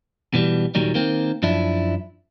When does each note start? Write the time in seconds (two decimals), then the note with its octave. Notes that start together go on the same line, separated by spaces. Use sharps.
0.34 B2 E3 G3
0.75 D#2 A#2 D#3 F#3 G3
0.94 D#3 A#3 C4
1.43 F#2 F3 D4 E4